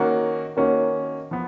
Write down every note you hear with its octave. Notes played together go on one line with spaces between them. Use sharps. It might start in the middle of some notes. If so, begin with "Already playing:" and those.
Already playing: D#3 A#3 C#4 F#4
D#3 A#3 C#4 F#4
F3 B3